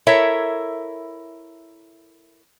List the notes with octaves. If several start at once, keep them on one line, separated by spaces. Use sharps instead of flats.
E4 A4 A#4 C#5 E5